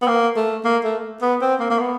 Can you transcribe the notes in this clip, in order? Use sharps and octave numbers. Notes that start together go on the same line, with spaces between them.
B3
A#3
A3
A#3
A3
B3
C4
A#3
A#3
B3